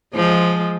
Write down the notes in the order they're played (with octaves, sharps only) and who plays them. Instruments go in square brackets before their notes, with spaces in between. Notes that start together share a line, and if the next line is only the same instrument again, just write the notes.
[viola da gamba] F3 G#3